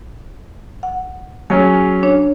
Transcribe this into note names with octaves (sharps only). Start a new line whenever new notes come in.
F#5
F#3 C#4 G#4 G#5
D4 C#5